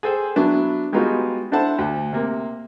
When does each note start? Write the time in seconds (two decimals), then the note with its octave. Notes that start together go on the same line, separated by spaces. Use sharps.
0.03 G#4 A4 C5 G5
0.36 F#3 B3 D4 E4 B4
0.92 G3 G#3 B3 D#4 F4 F#4
1.52 D4 E4 A4 C5 F#5 A5
1.78 D2
2.13 C3 A#3